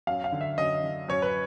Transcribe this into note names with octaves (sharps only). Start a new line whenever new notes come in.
F#2 F5
F5
D3
E5
F#2 D#5
D3
F#2 C#5
B4